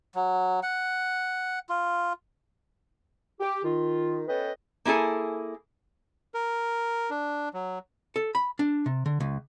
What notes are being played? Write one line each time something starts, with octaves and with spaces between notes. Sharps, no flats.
F#3
F#5
F4
G4
D#3 F4
B3 C#4 A4 B4 D#5 G5
A#3 E4 G#4 A4 G#5
A#4
D4
F#3
A4
B5
D4
C3
D3
C#2